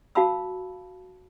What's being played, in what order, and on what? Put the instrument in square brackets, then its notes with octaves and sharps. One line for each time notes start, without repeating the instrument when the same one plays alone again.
[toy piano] F#4 F5 A5 B5 E6